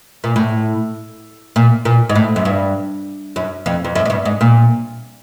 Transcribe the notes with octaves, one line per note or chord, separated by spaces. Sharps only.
A#2
A2
A#2
A#2
G#2
A2
F#2
G2
F#2
F2
F2
F#2
G#2
G2
G#2
A#2